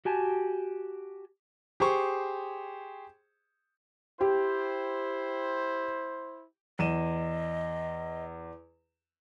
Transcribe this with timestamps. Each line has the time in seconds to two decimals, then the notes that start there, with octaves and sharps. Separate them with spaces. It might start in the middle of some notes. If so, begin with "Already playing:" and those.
0.05 F#4 G4 G#5 A5
1.80 G4 G#4 C5 C#6
4.21 E4 G4 C5
6.79 E2 D#5 D#7 E7